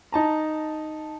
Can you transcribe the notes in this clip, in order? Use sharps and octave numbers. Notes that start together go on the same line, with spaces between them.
D#4 A5 A#5